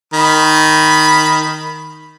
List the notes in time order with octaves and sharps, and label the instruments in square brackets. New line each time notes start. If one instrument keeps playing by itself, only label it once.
[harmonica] D#3 B5